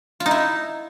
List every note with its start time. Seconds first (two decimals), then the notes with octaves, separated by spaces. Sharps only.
0.20 F4
0.26 D#4
0.31 E4